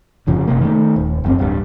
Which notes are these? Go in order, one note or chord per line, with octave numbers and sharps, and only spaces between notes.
G1 F2 C#3 F3
F#1 C3 A#3
D#3 G3 A3
D#1
F#1 F#2 C4
D1 G2